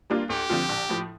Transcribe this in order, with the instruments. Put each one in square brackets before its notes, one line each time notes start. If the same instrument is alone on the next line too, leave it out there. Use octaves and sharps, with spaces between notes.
[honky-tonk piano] G3 A#3 D4 F4
[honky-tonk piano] D2 [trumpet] G4
[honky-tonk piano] D3 F3 C4 F4
A#1
A2 F3